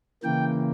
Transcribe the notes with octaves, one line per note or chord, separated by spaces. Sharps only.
C#3 E3 A#3 G5